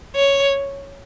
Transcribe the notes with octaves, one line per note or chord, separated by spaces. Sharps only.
C#5